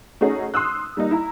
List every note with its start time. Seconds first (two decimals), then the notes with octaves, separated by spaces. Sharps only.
0.21 A3 C#4 D#4 F#4 G#4
0.54 C6 D#6 E6 F#6
0.97 G3 A#3 D#4
1.11 E4 A#5